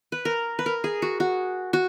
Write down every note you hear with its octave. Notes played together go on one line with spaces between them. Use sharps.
B4
A#4
B4
A#4
G#4
F#4
F#4
F#4